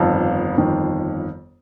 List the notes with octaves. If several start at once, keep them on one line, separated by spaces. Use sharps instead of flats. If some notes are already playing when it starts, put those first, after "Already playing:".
Already playing: G1 F2 D#3 F5 A5
G1 F2 D#3